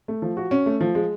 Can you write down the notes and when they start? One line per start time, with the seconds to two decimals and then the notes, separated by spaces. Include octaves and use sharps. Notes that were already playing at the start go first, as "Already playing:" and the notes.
0.08 A3
0.22 F3
0.37 F#4
0.51 C#4
0.66 A3
0.81 F3
0.95 G#3